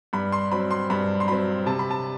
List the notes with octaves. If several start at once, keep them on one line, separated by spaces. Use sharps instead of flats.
G2 B5
C6
F#3 C4 B5
C6
G2 B5
C6
F#3 C4 B5
C3 A5
B5
A5